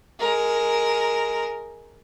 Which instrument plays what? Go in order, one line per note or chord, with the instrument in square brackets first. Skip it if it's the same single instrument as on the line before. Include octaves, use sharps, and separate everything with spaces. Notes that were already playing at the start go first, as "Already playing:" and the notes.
[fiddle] G#3 A#4